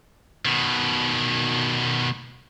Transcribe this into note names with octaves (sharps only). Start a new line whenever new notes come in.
B2 D#3